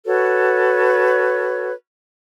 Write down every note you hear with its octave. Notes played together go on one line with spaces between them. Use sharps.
F#4 A4 B4 C#5